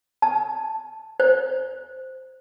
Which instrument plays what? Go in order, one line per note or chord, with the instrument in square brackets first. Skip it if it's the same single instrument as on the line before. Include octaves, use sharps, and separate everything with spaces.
[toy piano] A5
C5